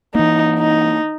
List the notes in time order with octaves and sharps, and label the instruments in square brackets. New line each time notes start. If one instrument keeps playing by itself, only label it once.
[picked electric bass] E3 A#3 [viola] D#4
[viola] D#4